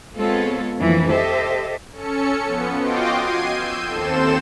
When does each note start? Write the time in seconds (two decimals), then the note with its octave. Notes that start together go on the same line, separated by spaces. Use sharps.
0.16 G#3 B3 C4 F4 A4 C#5
0.79 F2 E3 F3 A3 A#3 D4
1.09 G4 A4 C5 D#5 E5
1.92 C#4 A4 C#7
2.45 F3 B3
2.79 F4 F#4 D#5 G5 C6 D6
3.13 G#6 C7 D#7
3.55 E6 G6
3.86 D#2 C4 A4 C5 E7